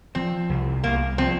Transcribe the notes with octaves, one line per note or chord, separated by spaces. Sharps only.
F3 C4
C2
C2 A#3
F3 C4